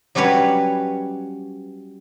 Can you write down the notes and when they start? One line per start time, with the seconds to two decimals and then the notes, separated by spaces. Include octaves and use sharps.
0.15 F#3 G3 C#4 B4 C#5